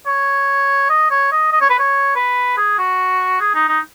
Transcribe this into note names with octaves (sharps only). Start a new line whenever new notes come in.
C#5
D#5
C#5
D#5
D#5
C#5
B4
C#5
B4
G#4
F#4
G#4
D#4
D#4